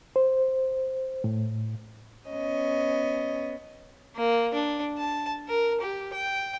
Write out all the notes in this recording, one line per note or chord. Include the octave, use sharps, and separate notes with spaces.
C5
A2
B3 C#4 D#5
A#3
D4
A5
A#4
G4
G5